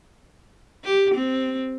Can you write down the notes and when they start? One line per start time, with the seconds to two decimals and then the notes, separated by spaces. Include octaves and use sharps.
0.84 G4
1.14 C4